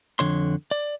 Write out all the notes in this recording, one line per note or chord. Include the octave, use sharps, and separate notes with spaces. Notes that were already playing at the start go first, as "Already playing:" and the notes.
F2 D3 C#5 C6
D5